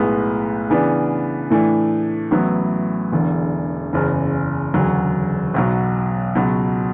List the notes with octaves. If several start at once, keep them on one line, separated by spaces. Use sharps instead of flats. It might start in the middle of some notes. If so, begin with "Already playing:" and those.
Already playing: B1 A2 G#3 B3
C#3 E3 B3 D4
A2 E3 A3 D4
A1 A2 F#3 B3 E4
E1 E2 D3
F#1 E2 C#3
E1 D2 C#3 F#3
B1 B2 F#3
C#2 B2 F#3